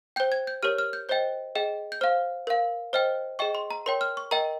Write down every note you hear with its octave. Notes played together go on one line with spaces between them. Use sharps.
C5 G5 G6
G#6
G6
G4 A#4 C#5 F6
F6
G6
C5 D#5 G5 G6
G#4 D#5 G5
G6
C5 F5 F6
A#4 F5
C5 D#5 G5 F6
G#4 D#5 G5 C#6
C6
A#5
A#4 C#5 G5 C6
F6
C#6
A#4 D#5 G5 A#5